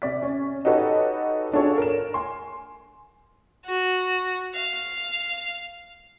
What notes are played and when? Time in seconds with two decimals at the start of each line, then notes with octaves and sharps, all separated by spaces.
0.02 C3 D5 B6
0.22 C#4
0.65 D#4 F#4 G4 A4 B4 C#5
1.53 D4 F4 F#4 G#4 A4 C#5
1.78 A#4 E7
2.14 G#5 C6
3.66 F#4
4.55 F5